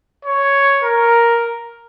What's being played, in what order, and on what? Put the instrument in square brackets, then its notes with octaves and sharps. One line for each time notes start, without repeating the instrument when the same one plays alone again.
[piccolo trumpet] C#5
A#4